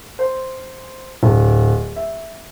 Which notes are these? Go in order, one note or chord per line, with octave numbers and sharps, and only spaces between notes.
C5
D1
E5